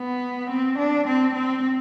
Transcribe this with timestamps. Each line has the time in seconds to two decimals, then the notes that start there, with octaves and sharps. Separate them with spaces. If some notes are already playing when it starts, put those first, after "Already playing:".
Already playing: B3
0.50 C4
0.79 D4
1.07 C4
1.35 C4